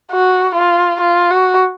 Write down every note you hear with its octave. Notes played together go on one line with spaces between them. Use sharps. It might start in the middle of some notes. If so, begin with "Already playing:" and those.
F#4
F4
F4
F#4